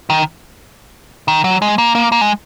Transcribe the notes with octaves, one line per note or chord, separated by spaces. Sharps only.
D#3
D#3
F#3
G#3
A#3
A#3
A#3
G#3